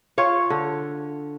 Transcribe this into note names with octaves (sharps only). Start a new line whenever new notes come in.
F4 C#5
D3